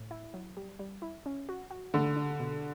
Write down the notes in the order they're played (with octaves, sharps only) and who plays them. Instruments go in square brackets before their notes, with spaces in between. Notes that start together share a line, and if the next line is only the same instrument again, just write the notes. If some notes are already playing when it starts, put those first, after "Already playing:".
Already playing: [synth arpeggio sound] A2
E4
F#3
G3
G3
E4
C#4
F#4
F#4
[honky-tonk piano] D3 [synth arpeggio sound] A3
[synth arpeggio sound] D4
B2